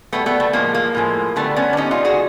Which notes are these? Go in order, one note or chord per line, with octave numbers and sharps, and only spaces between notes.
B2 G3 A3 B3
A3 B3
A3
A2 F3 G#3 A#3
A#3
A2 F3 G#3
D3 G3 A3 B3
B3 C#4
D4
D3 G3 C#4 D#4
D#4 F4
F#4 G#4